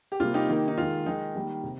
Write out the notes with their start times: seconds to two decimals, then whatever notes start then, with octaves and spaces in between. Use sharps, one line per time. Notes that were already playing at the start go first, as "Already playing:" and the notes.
0.12 G4
0.20 C3 G3 A#3 F4
0.34 D#4 G4
0.49 D#3 A#3
0.68 D#4
0.77 D#3 G#3 F4
1.06 D#3 G#3 D#4
1.35 D#3 G3 A#3
1.64 C3